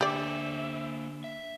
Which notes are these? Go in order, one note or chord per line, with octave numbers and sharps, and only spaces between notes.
D3 A#3 G4 C5 D5 E5 G#5
E5